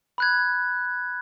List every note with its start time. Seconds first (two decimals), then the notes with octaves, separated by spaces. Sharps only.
0.18 B5 F#6 G#6